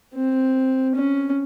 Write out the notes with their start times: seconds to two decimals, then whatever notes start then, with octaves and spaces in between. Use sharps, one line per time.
0.15 C4
0.95 C#4